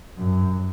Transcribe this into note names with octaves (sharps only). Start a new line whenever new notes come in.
F#2